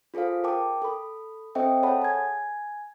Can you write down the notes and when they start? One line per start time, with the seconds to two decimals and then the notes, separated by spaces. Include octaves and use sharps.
0.14 F4 G#4 A4 C5 F5
0.44 A#4 G5 A5 D6
0.82 A4 B5
1.55 C4 A4 C5 D#5 E5 G5
1.83 G#4 A4 C#5 F#5 A5 B5
2.02 G#5 G#6